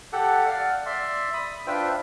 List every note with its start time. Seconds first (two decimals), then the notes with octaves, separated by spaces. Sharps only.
0.13 G4 A4 F#5
0.46 D5 F5 F#5
0.86 D5 E5 C6
1.34 B5 D#6
1.67 D4 F4 B4 C5 E5 G5